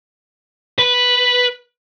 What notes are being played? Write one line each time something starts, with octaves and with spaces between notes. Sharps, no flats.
B4